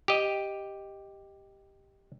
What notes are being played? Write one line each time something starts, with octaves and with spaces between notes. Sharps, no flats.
G4 D#5